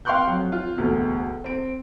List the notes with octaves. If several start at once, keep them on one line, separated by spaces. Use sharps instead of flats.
F5 G5 C6 C#6 F#6 G6
F2 F#3
F4
E1 D2 B2
C4 D7